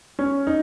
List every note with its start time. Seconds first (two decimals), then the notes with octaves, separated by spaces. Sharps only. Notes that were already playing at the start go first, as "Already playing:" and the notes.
0.19 C#4
0.47 D#4